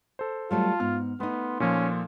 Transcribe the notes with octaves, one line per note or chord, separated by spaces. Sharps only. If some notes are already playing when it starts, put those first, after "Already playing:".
A4 C5
F#3 G3 A3 F4 A5
G#2 B3 F6
A3 B3 D#4 C6
A#2 F3 C#4